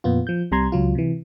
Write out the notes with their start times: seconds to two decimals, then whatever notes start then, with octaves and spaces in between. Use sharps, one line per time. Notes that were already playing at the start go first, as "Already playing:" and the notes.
0.04 F2 A#2 B3 F4
0.27 F3 G6
0.52 C2 C3 G3 A#5 C6 G#6
0.72 C#2 F#3 F4
0.95 C3 E3